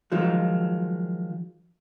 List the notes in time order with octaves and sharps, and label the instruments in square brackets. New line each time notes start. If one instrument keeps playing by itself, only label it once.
[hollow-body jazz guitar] D#3 F3 F#3 G#3